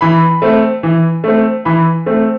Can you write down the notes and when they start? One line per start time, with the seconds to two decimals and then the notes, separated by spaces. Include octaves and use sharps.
0.01 E3 B5
0.42 A3 C4
0.83 E3
1.24 A3 C4
1.65 E3 B5
2.06 A3 C4